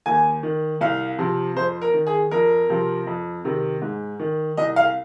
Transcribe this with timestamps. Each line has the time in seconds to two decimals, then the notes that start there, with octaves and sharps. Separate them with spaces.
0.06 D#2 G#5
0.43 D#3
0.81 C2 F5
1.19 C3 F3
1.56 F2 C5
1.82 A#4
1.94 D#3
2.07 G#4
2.31 F2 A#4
2.70 C3 F3
3.07 F2
3.45 C3 D#3
3.82 G#2
4.19 D#3
4.57 C2 D#5
4.76 F5